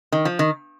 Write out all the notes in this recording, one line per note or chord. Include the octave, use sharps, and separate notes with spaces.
D#3
F3
D#3